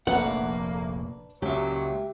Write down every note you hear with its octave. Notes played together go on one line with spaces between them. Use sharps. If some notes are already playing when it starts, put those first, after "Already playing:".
F1 A#1 A3 A#3 D4 B4 F#5
C#2 A#2 F#3 G4 E5